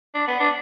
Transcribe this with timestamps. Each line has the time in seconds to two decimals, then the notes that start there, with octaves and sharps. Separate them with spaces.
0.15 D4
0.28 B3
0.40 D4